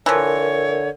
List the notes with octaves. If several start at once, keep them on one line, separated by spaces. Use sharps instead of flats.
D3 E3 F3 A#4 C#5